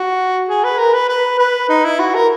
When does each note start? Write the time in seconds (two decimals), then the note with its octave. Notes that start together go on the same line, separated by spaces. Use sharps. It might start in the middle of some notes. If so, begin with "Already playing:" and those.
Already playing: F#4
0.49 G#4
0.64 B4
0.78 A#4
0.94 B4
1.09 B4
1.38 B4
1.69 D#4
1.85 E4
2.00 F#4
2.15 A#4